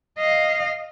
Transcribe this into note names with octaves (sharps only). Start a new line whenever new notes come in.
D#5 F5